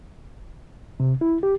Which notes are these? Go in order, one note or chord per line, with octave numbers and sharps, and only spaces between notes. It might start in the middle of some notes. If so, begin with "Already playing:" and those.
C3
E4
G4